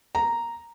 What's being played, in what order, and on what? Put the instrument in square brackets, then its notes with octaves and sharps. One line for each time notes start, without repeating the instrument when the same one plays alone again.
[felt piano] A#5